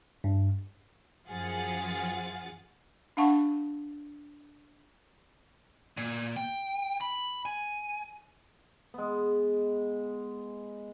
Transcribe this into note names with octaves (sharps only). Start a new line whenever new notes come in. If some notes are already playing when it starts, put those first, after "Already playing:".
G2
F#2 F3 F4 G#4 F#5 A6
D4 F5 F#5 A5 C#6
A#2
G5
B5
G#5
G#3 B3